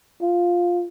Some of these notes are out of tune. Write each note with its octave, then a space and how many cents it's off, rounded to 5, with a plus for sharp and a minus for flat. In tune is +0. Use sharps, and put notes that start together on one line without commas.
F4 +5